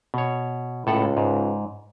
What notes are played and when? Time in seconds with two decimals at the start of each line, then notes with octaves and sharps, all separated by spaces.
0.14 B2 C#5
0.87 C#2 A2 A4 F#5
1.17 G#2